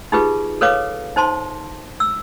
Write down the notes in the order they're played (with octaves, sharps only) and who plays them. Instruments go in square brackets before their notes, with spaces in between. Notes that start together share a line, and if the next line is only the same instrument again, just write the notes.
[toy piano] D#4 F4 G4 G#4 B4
A4 B4 C#5 F5 D6
D#4 C5 A5 C6
E6